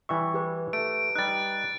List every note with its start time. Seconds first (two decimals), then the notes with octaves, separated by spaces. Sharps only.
0.09 E3 G3 E5 C#6
0.34 G4 B4
0.73 A3 D7
1.16 G3 D#4 F#6 A6